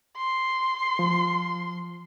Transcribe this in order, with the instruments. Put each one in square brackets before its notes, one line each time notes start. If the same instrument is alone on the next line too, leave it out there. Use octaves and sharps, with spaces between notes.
[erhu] C6
[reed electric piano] F3